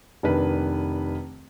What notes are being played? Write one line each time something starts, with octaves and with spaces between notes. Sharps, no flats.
F1 D#3 D4 B4